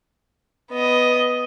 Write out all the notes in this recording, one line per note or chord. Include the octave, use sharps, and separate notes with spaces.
B3 D#5